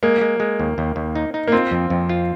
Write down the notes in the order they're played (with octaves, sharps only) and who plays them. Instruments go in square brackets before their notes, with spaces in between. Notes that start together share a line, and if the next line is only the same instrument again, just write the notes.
[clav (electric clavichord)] G#3 [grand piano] A#3
[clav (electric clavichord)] G#3
G#3
D#2
D#2
D#2
D#4
D#4
[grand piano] A#3
[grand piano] C4 [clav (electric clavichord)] F4
[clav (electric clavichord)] F2
F2
F4